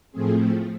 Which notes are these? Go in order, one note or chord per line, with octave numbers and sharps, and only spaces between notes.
A2 F3 A3 C4 G#4